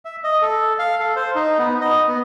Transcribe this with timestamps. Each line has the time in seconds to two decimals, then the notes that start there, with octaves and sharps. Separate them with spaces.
0.05 E5
0.24 D#5
0.42 A4
0.79 F5
1.00 A4
1.16 C5
1.35 D#4
1.58 B3
1.81 D#5
2.08 B3